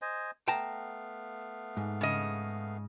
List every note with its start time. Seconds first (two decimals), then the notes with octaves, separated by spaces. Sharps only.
0.02 C5 D#5 G#5
0.48 A3 B3 F5 G5 A5 A#5
1.77 G#2
2.01 C#3 D#5